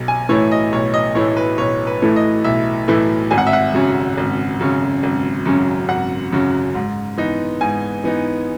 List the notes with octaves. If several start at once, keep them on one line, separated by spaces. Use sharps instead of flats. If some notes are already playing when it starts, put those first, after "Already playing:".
Already playing: B1
G#5
A2 E3 A3 E4 C#5
D#5
B1 C#5
D#5
A2 E3 A3 E4 C#5
B4
B1 C#5
B4
A2 E3 A3 E4
D#5
B1 E5
A2 E3 A3 E4
G#1 G#5
F#5
E5
F#5
F#2 C#3 F#3 C#4
G#1
F#2 C#3 F#3 C#4
G#1
F#2 C#3 F#3 C#4
G#1 F#5
F#2 C#3 F#3 C#4
G#2
E3 B3 D#4
G#2 G#5
E3 B3 D#4